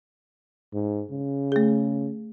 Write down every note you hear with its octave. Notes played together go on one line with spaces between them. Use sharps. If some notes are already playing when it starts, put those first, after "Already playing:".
G#2
C#3
A3 G#4